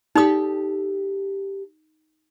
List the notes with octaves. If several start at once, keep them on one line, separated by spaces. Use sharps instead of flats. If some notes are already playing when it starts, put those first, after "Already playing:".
D#4 G4 A4 D5 D#6